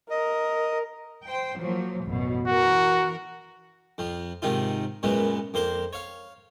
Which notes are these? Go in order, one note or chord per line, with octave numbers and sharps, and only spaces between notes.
A#4 D#5
C5 G5
F3 F#3 A#3
A1 F#2 B2
E3 F#4 A#4
F2 F3
G#2 C3 D#3 D#4 F4
F#2 A#2 F#3 G#3 B3
F2 A#3 C5 C6 D6
C#5 F5